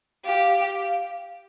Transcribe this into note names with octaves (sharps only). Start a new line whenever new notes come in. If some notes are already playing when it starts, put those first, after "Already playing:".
G4 F5